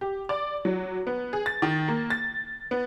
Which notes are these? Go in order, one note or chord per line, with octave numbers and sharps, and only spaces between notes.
G4
D5
F#3
B3
G#4
A6
D#3
A#3
A6
B3